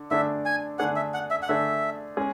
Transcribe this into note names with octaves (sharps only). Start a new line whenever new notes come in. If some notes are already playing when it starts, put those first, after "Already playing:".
Already playing: D3
D3 A3 D4 G#4 E5
G#5
D3 A3 D4 G#4 F#5
E5
F#5
E5
F#5
D3 A3 D4 G#4 E5
G#3 C#4 G#4